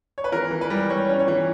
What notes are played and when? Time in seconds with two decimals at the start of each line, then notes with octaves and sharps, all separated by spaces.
0.18 C#5
0.24 B4
0.32 E3 A#4
0.51 E3
0.61 B4
0.70 G3
0.90 G3 C#5
1.09 C#4
1.19 C#5
1.28 E3